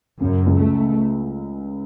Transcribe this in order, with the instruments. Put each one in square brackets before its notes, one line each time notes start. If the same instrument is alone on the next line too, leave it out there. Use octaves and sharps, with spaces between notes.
[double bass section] F#2 [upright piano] C#3
[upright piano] C#2
[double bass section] A3